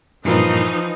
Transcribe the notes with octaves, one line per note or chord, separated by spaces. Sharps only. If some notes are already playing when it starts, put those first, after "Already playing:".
G2 A#2 E3 F3 D#4 A#4